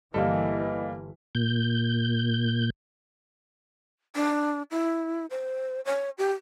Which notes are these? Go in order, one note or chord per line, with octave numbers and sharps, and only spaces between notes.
G1 E3 G3 A#3 A4 D#5
A#2 G6
D4
E4
C5
C#5
G4